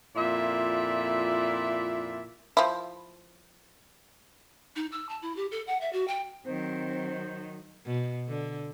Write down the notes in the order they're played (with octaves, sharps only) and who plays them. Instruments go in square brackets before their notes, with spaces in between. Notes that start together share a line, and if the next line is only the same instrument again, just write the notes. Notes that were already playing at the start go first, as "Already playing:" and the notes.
[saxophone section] F2 A#2 E4 F4 D5 E5
[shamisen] F3 E4
[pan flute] D#4
E6
A5
E4
G4
A4
F#5
E5
F#4
G5
[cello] D#3 F#3 [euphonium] C4 [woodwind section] C5
[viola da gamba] B2
D3